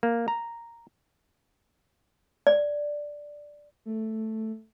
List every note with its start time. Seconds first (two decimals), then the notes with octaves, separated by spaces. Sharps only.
0.03 A#3
0.28 A#5
2.47 D5
3.85 A3